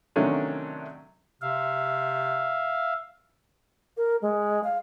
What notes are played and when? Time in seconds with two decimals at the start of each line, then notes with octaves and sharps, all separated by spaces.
0.16 C3 D#3 F#3 A3 C#4 D4
1.42 C3 E5 F5
3.97 A#4
4.22 G#3
4.64 F5